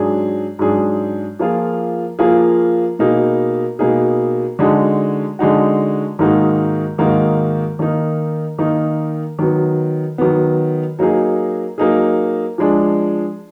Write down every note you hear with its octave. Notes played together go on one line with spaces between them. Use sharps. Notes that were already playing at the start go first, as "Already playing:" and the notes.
Already playing: G#2 F#3 D4 G#4
G#2 F#3 D4 G#4
F3 A#3 F4 G#4
F3 A#3 F4 G#4
B2 A#3 D#4 G#4
B2 A#3 D#4 G#4
D3 G#3 D#4 F#4
D3 G#3 D#4 F#4
G#2 D#3 A#3 D#4 F#4
G#2 D#3 A#3 D#4 F#4
D#3 A#3 D#4
D#3 A#3 D#4
D#3 F#3 B3
D#3 F#3 B3
F#3 A#3 D#4 G#4
F#3 A#3 D#4 G#4
F3 G#3 D4